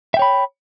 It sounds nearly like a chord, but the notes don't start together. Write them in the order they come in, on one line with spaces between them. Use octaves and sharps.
E5 G5 C#5 B5